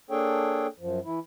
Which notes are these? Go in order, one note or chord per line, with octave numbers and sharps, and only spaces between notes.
A#3 D4 G#4 A4 C#5 G5
F#2 F3
E3 E4